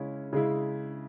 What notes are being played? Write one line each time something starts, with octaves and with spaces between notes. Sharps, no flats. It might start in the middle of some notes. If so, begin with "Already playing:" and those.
Already playing: C#3 G#3 C#4 E4
C#3 G#3 E4